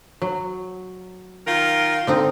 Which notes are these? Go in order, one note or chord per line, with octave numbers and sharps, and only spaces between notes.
F#3
D#3 F4 A#4
D3 C4 D#4